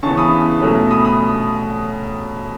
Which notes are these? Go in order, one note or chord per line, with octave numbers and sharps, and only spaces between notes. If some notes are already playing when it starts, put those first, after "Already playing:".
C#3 E3 B3 A5 C#6
B5 D#6
B2 F#3 A3 C#4
B5 D#6
B5 D#6